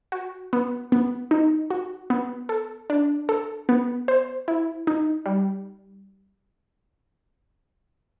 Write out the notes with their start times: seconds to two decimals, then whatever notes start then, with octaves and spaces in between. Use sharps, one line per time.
0.12 F#4
0.53 B3
0.92 B3
1.31 D#4
1.70 F#4
2.10 B3
2.49 A4
2.90 D4
3.29 A4
3.69 B3
4.08 C5
4.48 E4
4.87 D#4
5.26 G3